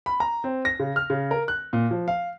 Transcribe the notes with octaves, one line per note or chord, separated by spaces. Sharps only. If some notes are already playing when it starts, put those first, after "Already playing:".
B5
A#5
C4
A#6
C#3
F6
C#3
A#4
F#6
A#2
F3
F5